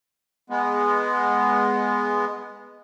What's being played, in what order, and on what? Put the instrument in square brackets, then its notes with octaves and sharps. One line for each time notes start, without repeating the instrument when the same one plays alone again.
[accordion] G#3 B3